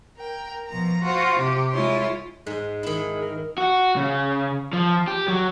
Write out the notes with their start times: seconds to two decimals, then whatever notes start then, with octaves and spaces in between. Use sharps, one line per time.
0.17 A#4 G5
0.67 B2 F3 A#5
1.01 F4 F#4 C5
1.38 C3 G4
1.71 G#3 E4 F4 C#5 C6
2.47 G#2 G#3
2.83 D#3 E4
3.22 A#4
3.58 F#4
3.96 C#3
4.73 F3
5.08 G4
5.28 F#3